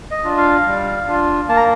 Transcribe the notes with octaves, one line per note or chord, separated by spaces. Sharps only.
D#5
D4 F4
F5
G3
D4 F4
A#3 A5
A#5